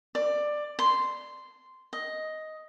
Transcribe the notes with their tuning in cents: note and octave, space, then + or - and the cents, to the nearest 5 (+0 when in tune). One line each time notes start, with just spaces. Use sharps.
D5 +15
C6 -10
D#5 +5